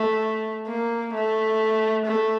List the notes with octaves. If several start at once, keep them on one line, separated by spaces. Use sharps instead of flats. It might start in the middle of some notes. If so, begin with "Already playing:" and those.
Already playing: A3
A#3
A3
A3